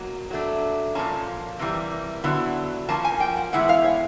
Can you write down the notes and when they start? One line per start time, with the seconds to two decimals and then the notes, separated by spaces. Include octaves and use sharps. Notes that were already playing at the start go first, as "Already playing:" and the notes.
Already playing: B2 F#3 A#3
0.30 F#3 A3 D4
0.95 A#2 F3 A#3 C#4 A5
1.59 C3 E3 G3 A#3
2.24 D3 F#3 B3 E4
2.89 F3 A#3 C#4 A5
3.04 G#5
3.20 G5
3.37 F#5
3.53 A2 E3 G#3 B3 E4 F#5
3.69 F5
3.84 C#5